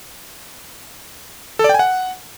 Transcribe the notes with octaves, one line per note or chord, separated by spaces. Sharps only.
A4
D5
G5
G#5
F#5